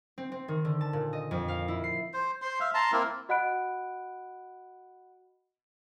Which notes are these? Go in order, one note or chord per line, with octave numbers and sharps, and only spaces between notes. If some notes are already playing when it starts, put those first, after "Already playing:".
C4
C4
D#3
D3
A5
A#2
D#5
F2
F5
E4
C7
C5
C5 C6
E5 F5
A5 A#5 C6
A#3 C4 E4 A#4
F#4 D#5 F#5 B5 F#6 D7